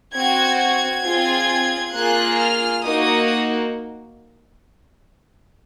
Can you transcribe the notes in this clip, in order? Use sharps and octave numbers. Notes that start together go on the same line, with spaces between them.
C4 F#4 G#6
G#6
C4 F4 G#4
A#3 F4 G#4 F#6
F6
A#3 D#4 F#4 D#6